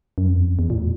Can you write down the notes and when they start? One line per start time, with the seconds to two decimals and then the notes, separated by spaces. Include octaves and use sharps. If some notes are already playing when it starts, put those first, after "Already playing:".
0.18 F#2
0.27 F2
0.59 E2
0.70 A#2
0.75 A2